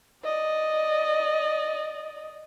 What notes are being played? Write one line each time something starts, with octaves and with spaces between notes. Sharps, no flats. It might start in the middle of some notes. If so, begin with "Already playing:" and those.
D5 D#5